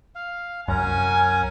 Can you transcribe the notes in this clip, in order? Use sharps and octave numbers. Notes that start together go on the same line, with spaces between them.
F5
C2 F#2 C#4 A#4 F#5 G#5